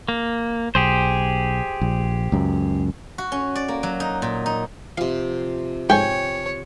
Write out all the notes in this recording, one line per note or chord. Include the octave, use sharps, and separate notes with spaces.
A#3
B1 G4 G#4 C5
A#1
C#2 F#2
F#4
C#4
D5
A#3
F#3
D#4
A#2
D#4
C3 F3 F5
G#2 A3 C#5 G5 G#5